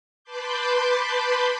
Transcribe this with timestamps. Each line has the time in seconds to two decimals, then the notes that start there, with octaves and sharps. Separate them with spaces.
0.24 B4 A5 B5 C6 D6 G6